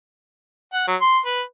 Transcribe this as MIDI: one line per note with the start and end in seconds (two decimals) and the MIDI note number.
0.74 0.87 78
0.87 0.96 54
1.01 1.19 84
1.25 1.41 71